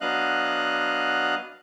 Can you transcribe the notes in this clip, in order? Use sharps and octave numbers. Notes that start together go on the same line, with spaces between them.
F#3 B3 D4 D#5 F5 F#6